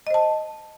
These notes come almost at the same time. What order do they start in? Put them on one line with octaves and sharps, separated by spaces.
D#5 C5 A5